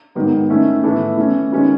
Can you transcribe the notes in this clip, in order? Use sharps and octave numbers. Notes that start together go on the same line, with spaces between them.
G#2 D#3 F#3 B3
D#3 A3 C#4 E4
A2 E3 B3 E4 A4
E3 A3 C#4
D#3 G#3 C#4 F#4 B4